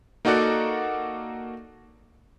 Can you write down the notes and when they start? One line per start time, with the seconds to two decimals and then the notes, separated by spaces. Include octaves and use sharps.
0.25 A#3 D#4 F#4 A4 D5 F#5